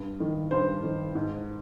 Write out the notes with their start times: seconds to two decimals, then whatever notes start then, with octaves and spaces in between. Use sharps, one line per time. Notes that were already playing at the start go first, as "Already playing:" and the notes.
Already playing: G2
0.20 D#3
0.51 G2 C5
0.83 D#3
1.15 G#2